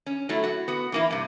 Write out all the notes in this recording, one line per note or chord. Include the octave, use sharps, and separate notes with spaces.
C#4
F#3 A3 E4
F#4
B3 F#4
E3 A#3 E4
G2 C3